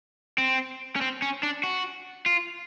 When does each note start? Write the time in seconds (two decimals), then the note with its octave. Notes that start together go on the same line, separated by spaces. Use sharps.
0.38 C4
0.96 C#4
1.01 C4
1.22 C#4
1.43 D4
1.64 F#4
2.26 F4